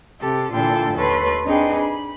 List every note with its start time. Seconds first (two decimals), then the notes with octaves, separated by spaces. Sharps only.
0.21 C3 G4 A4
0.53 A#2 D3 E3 F4 A4 G5
0.95 D#2 A4 B4 C#5 C6
1.46 C4 D4 D#4 G#4 B4 G5
1.78 B5